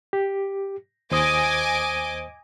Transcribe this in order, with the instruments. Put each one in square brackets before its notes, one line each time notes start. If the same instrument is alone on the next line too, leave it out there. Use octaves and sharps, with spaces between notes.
[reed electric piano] G4
[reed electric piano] D#2 C5 D#6 [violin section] D#5 G#5 D6